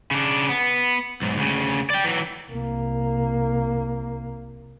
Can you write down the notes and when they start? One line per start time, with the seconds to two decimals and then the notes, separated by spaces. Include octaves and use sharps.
0.11 C#3 D4
0.49 B3
1.22 B1 G#2
1.37 D2 C#3
1.90 D5 G5
2.04 E3 F#3
2.51 C2 A#3